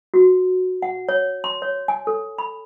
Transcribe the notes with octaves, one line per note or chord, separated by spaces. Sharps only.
F#4
F#5
C#5
C6
C#5
G#5
A4
B5